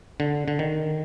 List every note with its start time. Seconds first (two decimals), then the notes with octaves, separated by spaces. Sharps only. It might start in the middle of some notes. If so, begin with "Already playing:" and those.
0.20 D3
0.48 D3
0.59 D#3